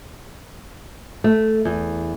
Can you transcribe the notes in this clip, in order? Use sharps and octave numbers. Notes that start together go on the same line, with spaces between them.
A3
E2